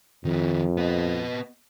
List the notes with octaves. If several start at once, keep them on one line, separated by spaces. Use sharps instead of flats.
F2 D#3 E4
B3 D#5